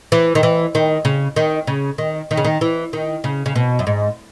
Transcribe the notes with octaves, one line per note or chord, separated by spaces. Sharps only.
E3
D#3
E3
D#3
C#3
D#3
C#3
D#3
D#3
C#3
D#3
E3
D#3
C#3
C#3
B2
F#2
G#2